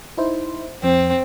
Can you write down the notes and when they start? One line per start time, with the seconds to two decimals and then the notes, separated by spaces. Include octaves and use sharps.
0.17 D#4 E4 C5
0.83 F2 C4